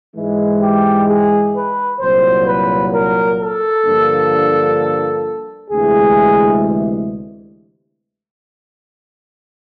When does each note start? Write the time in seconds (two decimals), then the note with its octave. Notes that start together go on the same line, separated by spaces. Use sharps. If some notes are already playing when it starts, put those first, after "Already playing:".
0.15 G#2 E3 G#3
0.61 G4
1.08 G#4
1.54 B4
2.00 C2 A#2 F#3 C5
2.47 B4
2.93 A#4
3.39 A4
3.85 G2 D3 F3 A#3
5.71 D2 C3 E3 G#3 G#4